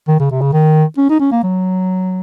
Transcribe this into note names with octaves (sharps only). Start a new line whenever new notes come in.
D#3
C#3
C3
C#3
D#3
C#4
D#4
C#4
A#3
F#3